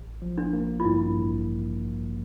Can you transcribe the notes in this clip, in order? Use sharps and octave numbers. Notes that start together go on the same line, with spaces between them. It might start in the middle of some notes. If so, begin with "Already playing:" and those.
Already playing: A1
F3
D4
A#3
F4
G2 E4
A1